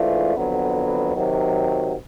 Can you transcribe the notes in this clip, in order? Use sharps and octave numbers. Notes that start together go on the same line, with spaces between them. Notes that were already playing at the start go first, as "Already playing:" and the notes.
Already playing: G#2 E3 A3 D4 F4
F2 D3 F#3 B3
C3 D#3 F#3